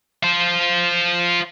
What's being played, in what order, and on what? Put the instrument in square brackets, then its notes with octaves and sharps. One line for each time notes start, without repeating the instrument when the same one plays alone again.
[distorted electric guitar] F4 C5